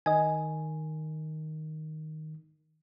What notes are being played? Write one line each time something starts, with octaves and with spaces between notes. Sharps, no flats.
D#3 D#5 G#5